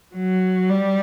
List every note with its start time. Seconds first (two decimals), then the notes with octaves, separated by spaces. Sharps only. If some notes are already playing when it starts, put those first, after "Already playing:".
0.16 F#3
0.70 G3